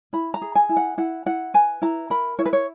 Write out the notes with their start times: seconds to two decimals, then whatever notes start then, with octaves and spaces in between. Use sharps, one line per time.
0.13 E4 B5
0.34 A#5
0.42 G#4
0.55 G#5
0.69 E4
0.77 F#5
0.98 E4 F#5
1.26 E4 F#5
1.54 B4 G#5
1.82 E4 A#5
2.10 A#4 B5
2.39 E4 C#5
2.46 B4
2.53 C#5